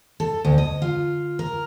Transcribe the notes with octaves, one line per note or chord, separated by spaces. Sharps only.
A4
D2
D#5
F4
A#4